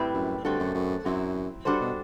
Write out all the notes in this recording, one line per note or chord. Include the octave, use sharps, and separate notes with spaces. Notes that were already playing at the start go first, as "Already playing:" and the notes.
Already playing: A2 G3 C4 E4 B4
F#2
G2 D3 A3 C4 F#4 A4
F#2
F#2
F#2 F#3 C4 E4
G2 G3 D4 F#4 A4 C5
B2